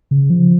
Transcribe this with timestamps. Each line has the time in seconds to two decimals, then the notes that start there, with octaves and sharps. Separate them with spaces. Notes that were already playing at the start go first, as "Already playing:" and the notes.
0.11 C#3
0.30 F3